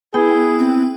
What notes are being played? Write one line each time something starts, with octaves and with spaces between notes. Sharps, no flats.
B3 E4 G#4 G5
C4